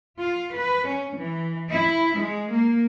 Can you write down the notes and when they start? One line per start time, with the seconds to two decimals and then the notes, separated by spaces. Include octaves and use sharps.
0.19 F4
0.54 B4
0.87 C#4
1.18 E3
1.72 E4
2.19 G#3
2.51 A#3